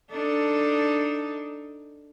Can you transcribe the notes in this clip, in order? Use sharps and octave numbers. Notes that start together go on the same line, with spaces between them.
D4 D#4 A4